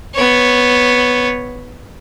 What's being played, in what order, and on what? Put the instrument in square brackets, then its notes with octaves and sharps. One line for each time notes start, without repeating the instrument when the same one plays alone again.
[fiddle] B3 C#5